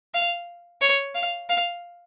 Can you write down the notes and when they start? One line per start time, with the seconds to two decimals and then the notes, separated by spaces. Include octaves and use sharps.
0.14 F5
0.81 C#5
1.15 F5
1.49 F5